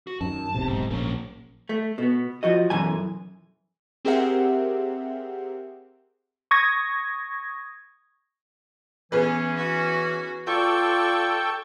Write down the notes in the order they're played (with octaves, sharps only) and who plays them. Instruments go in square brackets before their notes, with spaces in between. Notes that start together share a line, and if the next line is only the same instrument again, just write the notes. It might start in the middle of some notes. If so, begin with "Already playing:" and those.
[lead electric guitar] F#4
[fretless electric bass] F#2 D#3 [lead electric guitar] A5
[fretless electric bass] E1 B1 C3
[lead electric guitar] G#2
[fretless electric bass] A#1 [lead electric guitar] A#3 C#4
[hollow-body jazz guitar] A3
B2 B3
F3 F#4 D#5
B1 F#2 E3 G#5
[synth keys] C4 G4 G#4 A#4 E5 F#5
[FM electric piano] C#6 D#6 G#6 A#6
[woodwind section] E3 C#4 [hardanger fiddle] B3 [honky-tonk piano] G#4 B4
[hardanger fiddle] F#4
[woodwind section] F4 D5 [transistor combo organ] A4 G5 [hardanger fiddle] C#6